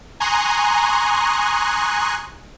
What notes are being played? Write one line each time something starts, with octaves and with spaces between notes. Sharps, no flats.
G#5 A#5 C6 C#6 D#6 F#6